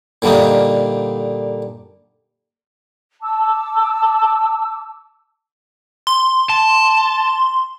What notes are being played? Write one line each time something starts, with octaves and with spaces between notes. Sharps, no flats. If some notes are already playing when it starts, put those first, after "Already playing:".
A#2 D3 G3 A#3 D#4
A5 D6 E6
C6
A5